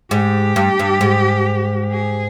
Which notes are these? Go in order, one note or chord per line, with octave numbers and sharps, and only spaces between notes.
G#2 G4
G2
G2
G#2
G#4